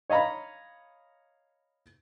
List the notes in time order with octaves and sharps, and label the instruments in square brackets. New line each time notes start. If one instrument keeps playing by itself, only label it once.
[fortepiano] C#5 D#5 F5 A#5 B5